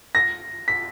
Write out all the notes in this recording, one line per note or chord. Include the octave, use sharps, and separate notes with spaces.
A#6
B6